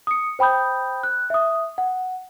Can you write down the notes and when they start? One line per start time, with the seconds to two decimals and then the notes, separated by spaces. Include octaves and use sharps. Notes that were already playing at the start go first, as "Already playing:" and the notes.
0.07 D#6 C#7
0.39 C5 G5 B5 D#6 G6
1.03 F#6
1.30 E5 D#6
1.78 F#5